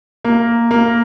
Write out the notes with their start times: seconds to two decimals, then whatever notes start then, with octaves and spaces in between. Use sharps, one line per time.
0.25 A#3
0.71 A#3